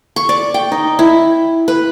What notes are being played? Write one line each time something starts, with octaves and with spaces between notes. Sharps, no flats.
C#6
D5
G5
D#4
E4
B4